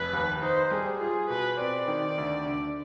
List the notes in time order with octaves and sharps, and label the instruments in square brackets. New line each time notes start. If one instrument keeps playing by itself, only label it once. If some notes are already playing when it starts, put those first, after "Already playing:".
Already playing: [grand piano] F1 [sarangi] B4
[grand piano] D#2
[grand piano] D#4 [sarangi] C5
[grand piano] G3 [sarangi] G#4
[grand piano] F4 [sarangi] G#4
[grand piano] B2 [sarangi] B4
[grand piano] C4 [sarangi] D5
[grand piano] D#3
D2
D3